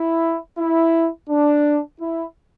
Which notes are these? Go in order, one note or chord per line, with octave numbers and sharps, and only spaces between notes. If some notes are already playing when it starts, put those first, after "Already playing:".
Already playing: E4
E4
D4
E4